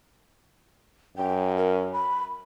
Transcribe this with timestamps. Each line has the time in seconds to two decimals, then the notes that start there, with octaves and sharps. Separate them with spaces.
1.17 F#2 G5
1.57 A#4
1.93 B5